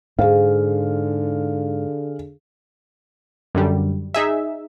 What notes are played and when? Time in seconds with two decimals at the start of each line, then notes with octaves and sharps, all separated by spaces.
0.19 G#2 D3 G#4 F5
3.55 F#2 D3 G3
4.14 D#4 G#4 E5